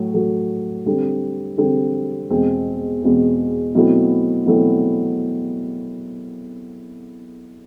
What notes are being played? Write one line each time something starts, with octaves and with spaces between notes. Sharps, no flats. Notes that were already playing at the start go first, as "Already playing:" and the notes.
Already playing: A2 F#3
A2 F#3 A3
D3 G3 C4
D3 G3 C4
E2 B2 G#3 C4
E2 B2 G#3 C4
B2 F#3 A3 C4 E4
B2 F#3 A3 C4 E4